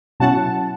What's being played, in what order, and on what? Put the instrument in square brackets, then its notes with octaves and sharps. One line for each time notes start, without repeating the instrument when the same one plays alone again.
[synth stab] B2 F#3 C#4 E4 F#5 A5